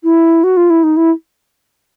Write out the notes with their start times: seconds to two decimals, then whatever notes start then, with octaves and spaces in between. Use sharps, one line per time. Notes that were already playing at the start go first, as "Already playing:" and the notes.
0.04 E4
0.44 F#4
0.57 F4
0.70 E4
0.83 D#4
0.97 E4